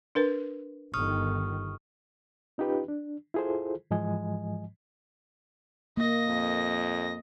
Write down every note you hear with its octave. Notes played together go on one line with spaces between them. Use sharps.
D4 A#4 B4
G1 D#3 C#6 D#6 F6
C#4 D#4 F4 G4 B4
D4
E4 F4 G#4 A4 C5
G#2 E3 F3 G#3 D#5 G#5
A#3 D#5 A#6
F2